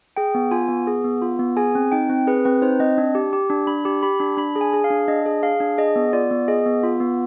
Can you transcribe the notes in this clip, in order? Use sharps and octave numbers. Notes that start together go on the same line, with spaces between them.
G#4 G5
B3
F4 G#5
B3
G#4
B3
F4
B3
G#4 G#5
C4
D#4 G5
C4
G#4 B4
C4 B4
D#4 C5
C4 D#5
D4
G4
G4
D4
D4 B5
G4
G4 B5
D4
D4 B5
G#4
G#5
G#4
F5
D4
D4 D#5
G#4
G#4 F5
D4
G#4 D#5
B3
F4 D5
B3
G#4 D#5
B3
F4
B3